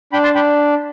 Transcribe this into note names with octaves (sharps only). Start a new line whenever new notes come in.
D4 G5 B5
A5 C6
D4 G5 B5